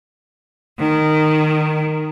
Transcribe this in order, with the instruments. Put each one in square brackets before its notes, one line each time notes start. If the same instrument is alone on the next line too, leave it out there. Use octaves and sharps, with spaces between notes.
[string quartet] D#3